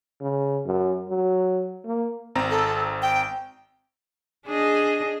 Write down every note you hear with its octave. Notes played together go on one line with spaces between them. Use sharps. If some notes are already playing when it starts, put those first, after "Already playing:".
C#3
F#2
F#3
A#3
G#1 C4 A#5
A4
G5
D4 G#4 D#5